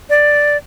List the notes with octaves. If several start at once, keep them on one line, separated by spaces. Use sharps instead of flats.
D5